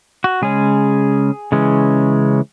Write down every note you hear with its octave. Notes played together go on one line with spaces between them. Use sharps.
F#4
C#3 G#3 C#4 G#4
C#3 E3 G#3 C#4